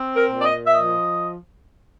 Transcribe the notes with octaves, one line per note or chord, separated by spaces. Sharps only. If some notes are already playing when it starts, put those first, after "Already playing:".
Already playing: C4
A#4
A#2
D5
D#5
E5
F3 D#5